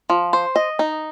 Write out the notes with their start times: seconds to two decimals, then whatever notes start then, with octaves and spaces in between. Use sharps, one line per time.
0.10 F3
0.33 C5
0.56 D#5
0.79 D#4